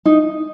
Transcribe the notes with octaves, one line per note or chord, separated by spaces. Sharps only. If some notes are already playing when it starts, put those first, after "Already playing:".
D#4